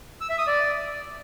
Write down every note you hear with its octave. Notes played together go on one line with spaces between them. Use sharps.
E6
E5
D#6
D5